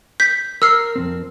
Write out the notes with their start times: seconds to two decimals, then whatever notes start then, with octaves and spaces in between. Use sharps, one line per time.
0.20 G6 B6
0.62 A#4 E6 F6 C7
0.95 F2 G#2 C4